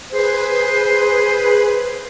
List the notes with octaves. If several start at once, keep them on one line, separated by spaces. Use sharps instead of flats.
G#4 B4 C5